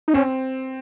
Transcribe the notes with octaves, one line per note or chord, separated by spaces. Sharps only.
D#4
C4 C#4